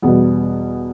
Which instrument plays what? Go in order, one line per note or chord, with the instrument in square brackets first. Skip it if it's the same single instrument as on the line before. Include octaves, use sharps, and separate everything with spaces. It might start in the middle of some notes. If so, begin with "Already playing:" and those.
[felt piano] E2 B2 G3 B3